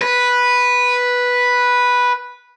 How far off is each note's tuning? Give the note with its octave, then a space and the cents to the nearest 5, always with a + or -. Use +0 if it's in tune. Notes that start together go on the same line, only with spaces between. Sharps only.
B4 -5